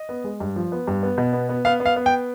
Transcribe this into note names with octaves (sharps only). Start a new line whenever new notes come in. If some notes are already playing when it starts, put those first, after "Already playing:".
Already playing: D#5
B3
G#3
G2
F3
B3
G2
B3
B2
B3
B3
B3 F5
B3
F5
B3
G5